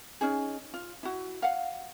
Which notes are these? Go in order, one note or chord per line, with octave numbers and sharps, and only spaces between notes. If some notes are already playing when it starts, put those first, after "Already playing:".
C#4 D#4 G#4
F4
E4 F#4
F5 F#5